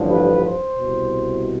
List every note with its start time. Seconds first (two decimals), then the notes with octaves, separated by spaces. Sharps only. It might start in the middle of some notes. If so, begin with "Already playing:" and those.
Already playing: A1 G2 D3 F3
0.08 B4
0.43 C5
0.78 C2 B2